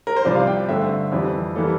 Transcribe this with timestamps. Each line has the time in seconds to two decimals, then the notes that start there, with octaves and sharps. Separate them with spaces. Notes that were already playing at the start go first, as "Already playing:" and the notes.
0.07 A#4
0.16 C5
0.25 C2 C3 F3 D5
0.36 F5
0.47 G5
0.68 G2 D3 A3 C4 E5
1.11 F2 E3 G3 C4
1.56 E3 G3 A#3 A4